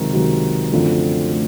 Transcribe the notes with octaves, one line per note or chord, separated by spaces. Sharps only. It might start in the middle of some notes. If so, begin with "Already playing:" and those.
Already playing: C#2 C3 D#3 F#3
C#2 C3 D#3 F#3
F#2 D3 F3 A3 C4
A3